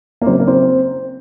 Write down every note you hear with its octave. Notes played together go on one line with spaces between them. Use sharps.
A#3
C#3 F#3 C4
A#3
C4